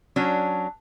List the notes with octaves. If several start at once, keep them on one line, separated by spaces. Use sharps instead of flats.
F#3 C#4 D4